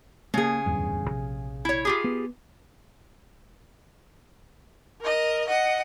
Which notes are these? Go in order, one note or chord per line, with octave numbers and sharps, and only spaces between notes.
C#3 A3 A#3 G#4
D1 E2 G2
A#1 C3
E4 C#5
F4 G4 G#4
B3
A#4 D#5
D#5 F#5